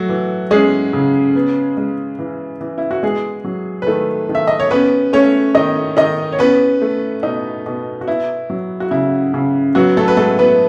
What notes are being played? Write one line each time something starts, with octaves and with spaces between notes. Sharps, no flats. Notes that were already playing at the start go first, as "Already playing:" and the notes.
Already playing: F#3 A3 F#4
E3
G#3 C#4 G#4
C#3
B3
G#3
E3
E3
E4
F#4
G#3 B3 G#4
F#3
B4
D#3 A3 A4
D#3
E5
D#5
C#5
B3 C#4 B4
A3 C#4 C#5
D#3 D#4 D#5
D#3 D#4 D#5
C#5
B3 C#4 B4
A3
B2 D#4
B2
F#4
B3 E4
F#3
F#4
C#3 E4
C#3
F#3 B3 F#4
A3 A4
B4
G#3 A3 A4
B3 B4